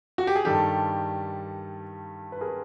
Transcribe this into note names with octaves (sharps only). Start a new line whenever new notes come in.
F#4
G4
G#4
G2 D#3 G3 G4 A4
B4
G#4 A#4